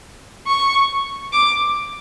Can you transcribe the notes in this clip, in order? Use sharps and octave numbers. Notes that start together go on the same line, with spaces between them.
C#6
D6